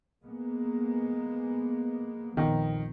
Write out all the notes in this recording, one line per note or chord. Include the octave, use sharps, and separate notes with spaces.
G#3 A#3 B3
A#1 F2 D#3 B3